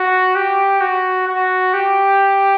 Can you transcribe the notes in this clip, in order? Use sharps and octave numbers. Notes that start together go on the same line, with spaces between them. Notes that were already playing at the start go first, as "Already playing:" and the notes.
Already playing: F#4
G4
F#4
F#4
G4